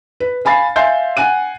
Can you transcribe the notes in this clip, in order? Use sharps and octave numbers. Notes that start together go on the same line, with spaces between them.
B4
F5 G#5 B5 A6 C7
E5 F5 G#5 C6 G6 C7
F#5 G#5 F#6 D#7